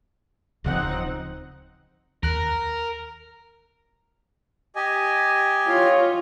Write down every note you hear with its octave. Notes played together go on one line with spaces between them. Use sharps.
D1 C#3 F3 C4 D#4 F#5
D#2 A#4 F#6
G4 D#5 G#5
F4 C#5